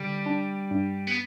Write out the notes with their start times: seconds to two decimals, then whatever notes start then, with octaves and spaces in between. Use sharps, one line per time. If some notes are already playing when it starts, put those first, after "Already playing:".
Already playing: D3 G3
0.26 D4
0.71 G2
1.07 B3